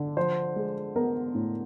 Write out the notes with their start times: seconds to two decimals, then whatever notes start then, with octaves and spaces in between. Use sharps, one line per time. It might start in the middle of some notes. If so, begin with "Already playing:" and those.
Already playing: D3
0.17 F3 C5
0.56 G#3
0.96 B3 A#4
1.34 A2